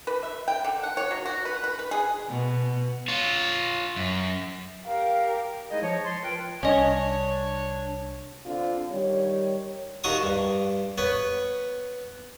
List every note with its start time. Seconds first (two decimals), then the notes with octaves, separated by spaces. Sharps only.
0.07 B4
0.23 E5
0.48 G5
0.64 D3
0.83 F#5
0.97 C#5
1.11 F#3
1.26 F#4
1.45 B4
1.64 B4
1.79 B4
1.91 G#4
2.29 B2
3.08 F4 C#5
3.96 F#2
4.86 G4 A#4 F5
5.70 G#3 D#4 E4 G#4 D#5
5.82 F3 C#5
6.05 A5 C6
6.23 F4 A#4 B4 G5
6.63 C2 C#4 D4 C#5 D#5
8.45 D3 C4 D4 F4
8.89 D#3 G3 C#5
10.04 D#2 D#3 D#4 F#4 C#6 D#6
10.23 G2
10.98 B3 B4 C#5